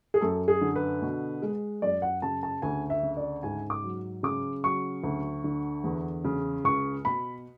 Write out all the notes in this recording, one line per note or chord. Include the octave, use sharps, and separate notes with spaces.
G#4
F#2 A4
G#4
D3
B4
B2
G#3
F#2 D5
F#5
C#3 A5
A5
D2 G#5
E5
C#3
D5
G#2 G#5
D6
F#3
C#3 D6
F#3 C#6
D2
D3
E2
C#3
C#2 C#6
B2 B5